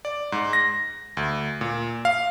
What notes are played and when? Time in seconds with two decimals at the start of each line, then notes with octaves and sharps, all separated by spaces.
0.05 D5
0.32 G#2
0.53 A#6
1.17 D2
1.61 A#2
2.05 F5